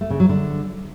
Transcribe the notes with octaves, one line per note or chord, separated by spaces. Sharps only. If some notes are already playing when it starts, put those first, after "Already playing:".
A3
C#3
F#3
D3